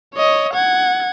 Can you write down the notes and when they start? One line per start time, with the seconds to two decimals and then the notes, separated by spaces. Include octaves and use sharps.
0.14 C#5 D#5
0.53 F#5 G#6